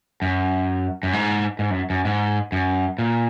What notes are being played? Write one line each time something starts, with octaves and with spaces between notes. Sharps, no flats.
F#2
F#2
G#2
G#2
F#2
F#2
G#2
F#2
A#2